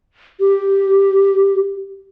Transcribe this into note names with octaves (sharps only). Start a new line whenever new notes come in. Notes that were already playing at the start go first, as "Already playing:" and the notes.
G4